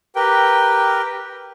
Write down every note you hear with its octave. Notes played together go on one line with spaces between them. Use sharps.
G4 A#4 B4 G5